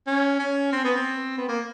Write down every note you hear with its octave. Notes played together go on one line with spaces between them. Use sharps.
C#4
C#4
C4
B3
C4
B3
A#3